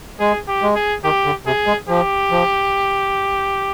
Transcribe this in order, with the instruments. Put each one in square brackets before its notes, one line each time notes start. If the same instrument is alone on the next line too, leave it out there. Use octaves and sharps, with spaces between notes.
[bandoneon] G#3 [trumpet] G#4
[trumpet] G4
[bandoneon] G#3
[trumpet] G#4
[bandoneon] D#3 [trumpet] G4
[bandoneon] D3
[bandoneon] C3 [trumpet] G#4
[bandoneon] G#3
[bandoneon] F3 [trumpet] G4
[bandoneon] F3